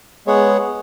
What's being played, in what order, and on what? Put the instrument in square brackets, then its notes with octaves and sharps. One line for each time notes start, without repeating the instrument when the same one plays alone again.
[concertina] G#3 B3 G#4 C#5 F#5